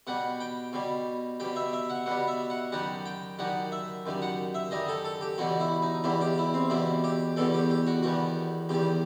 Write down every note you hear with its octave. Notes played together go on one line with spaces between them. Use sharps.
B2 G3 F#5
G5
B2 G3
B2 G3 G5
E5
E5
F#5
B2 G3 F#5
E5
F#5
F#2 D#3 G3 F#5
G5
F#2 D#3 G3 F#5
E5
F#2 D#3 G3
F#5
E5
F#2 D#3 G3 D#5
A4
A4
G4
E2 B2 G3 F#4
E4
D#4
E2 B2 G3 E4
G4
E4
C4
E2 B2 G3 E4
G4
E2 B2 G3 A4
G4
G4
F#4
E2 D#3 G3 F#4
E2 D#3 G3 G4